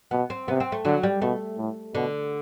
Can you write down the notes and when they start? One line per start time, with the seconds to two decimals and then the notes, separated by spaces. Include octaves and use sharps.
0.11 B2 B3
0.30 C4
0.48 C3 B3
0.60 C4
0.72 A3
0.85 D3 F#3
1.03 G3
1.22 B2 A3
1.58 A2
1.94 B2 D3